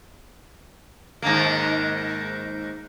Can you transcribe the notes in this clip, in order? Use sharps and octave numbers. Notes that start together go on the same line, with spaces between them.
G#2 D#3 A#3